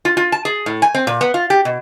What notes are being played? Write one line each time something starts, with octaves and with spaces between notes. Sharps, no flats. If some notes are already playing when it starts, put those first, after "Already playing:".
F4
F4
A5
G#4
A2
G#5
C4
A#2
B3
F4
G4
B2